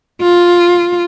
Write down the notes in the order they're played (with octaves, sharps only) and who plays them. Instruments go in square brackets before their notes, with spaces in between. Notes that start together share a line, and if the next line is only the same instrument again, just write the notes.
[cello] F4